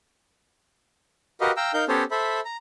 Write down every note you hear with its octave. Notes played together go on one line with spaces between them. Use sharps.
F#4 G4 A#4 B4 D#5 F5
F5 G5 A#5 E6
D#4 A#4 F5 G6
B3 C#4 G4 A4 C5 C#5
A4 C5 E5 B5
A#5